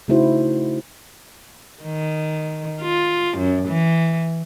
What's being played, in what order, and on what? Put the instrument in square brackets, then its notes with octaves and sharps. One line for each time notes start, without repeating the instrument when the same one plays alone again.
[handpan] C#3 A3 D#4 E4 F#4 C5
[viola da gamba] D#3
F4
F#2
E3